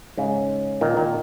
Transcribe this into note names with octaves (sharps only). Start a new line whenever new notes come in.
G#2 C#3
A#2 D#3
A#2 D#3